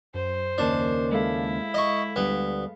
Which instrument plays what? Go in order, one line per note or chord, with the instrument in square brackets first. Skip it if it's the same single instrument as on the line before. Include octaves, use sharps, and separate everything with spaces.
[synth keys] F#2 [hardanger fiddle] C5
[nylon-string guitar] D#2 C#3 A#3 [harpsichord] D4
[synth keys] G#3 A4 F5 [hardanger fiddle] E4
[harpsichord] D#5 C#6
[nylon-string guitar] D2 G3 D4 [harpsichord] B3